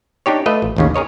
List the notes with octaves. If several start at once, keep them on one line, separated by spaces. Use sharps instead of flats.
D4 D#4 G4 C#5
A3 F4 B4 D#5
A1
A1 D#2 C#3
G#4 A#4 C#5 D#5